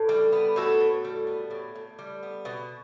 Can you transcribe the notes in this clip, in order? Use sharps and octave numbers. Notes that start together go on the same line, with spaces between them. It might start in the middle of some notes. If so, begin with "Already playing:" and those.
Already playing: A2
G3
B3
A2 F#4 A4
A2
G3
B3
A2
A2
G3
B3
B2